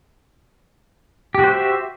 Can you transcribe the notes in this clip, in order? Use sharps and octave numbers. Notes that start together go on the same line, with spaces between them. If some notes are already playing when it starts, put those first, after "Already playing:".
F#4 G4 C5 E5